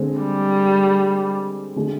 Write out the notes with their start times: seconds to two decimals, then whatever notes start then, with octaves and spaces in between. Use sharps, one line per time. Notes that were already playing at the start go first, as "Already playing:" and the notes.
Already playing: D3 G#3 C4
0.19 G3
1.76 D3 G#3